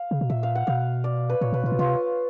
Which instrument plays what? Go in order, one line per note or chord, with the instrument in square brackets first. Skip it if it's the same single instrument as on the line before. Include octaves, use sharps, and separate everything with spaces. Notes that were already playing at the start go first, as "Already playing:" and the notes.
Already playing: [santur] F5
[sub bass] C#3
B2
[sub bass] A#2 [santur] E5
[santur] F5
F#5
[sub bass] B2 [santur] F5
[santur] D5
B4
[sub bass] A#2 [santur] C#5
[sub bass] B2 [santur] B4
[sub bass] A#2 [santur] F4
[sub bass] B2
[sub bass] C3 [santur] F4